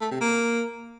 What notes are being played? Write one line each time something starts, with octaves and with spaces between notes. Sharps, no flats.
A3
C3
A#3